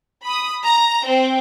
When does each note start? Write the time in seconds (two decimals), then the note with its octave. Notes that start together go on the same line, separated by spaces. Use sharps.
0.24 B5 D#6
0.64 A#5
1.05 C4